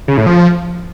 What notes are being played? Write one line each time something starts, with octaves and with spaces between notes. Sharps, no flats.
C#3
A2
F3